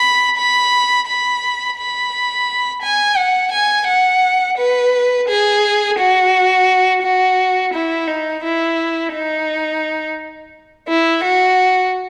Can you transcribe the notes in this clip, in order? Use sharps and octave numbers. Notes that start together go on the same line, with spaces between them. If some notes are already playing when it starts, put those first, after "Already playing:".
Already playing: B5
B5
B5
B5
G#5
F#5
G#5
F#5
B4
G#4
F#4
F#4
E4
D#4
E4
D#4
E4
F#4